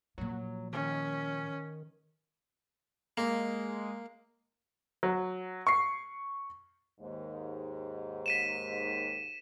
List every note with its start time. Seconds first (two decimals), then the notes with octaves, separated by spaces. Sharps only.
0.18 A#2 F3 F#3
0.73 D#3 C#4
3.17 G#3 A#3
5.03 F#3
5.67 C#6 C7
7.01 D#2 G#2
8.26 B6 D#7 E7